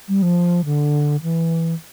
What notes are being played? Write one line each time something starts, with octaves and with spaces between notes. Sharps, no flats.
G3
F3
D3
E3